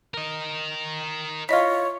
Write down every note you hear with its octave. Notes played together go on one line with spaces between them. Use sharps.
A#4 D#5
E4 F4 C#5 D#5 B6